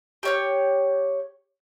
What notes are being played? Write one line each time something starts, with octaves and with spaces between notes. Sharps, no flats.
G4 C#5 F6